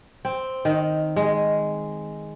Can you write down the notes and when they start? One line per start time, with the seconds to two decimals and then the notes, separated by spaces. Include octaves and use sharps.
0.25 C4
0.65 D#3
1.16 G#3